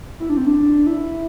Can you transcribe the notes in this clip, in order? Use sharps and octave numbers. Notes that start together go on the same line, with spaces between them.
E4
D4
C4
D4
E4